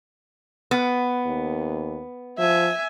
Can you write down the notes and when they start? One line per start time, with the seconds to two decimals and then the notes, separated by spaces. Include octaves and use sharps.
0.71 B3
1.26 D#2
2.39 F3 E5 G#5